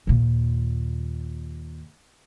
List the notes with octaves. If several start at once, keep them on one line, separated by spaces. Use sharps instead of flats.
D#2 A#2